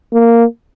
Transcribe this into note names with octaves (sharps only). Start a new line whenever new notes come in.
A#3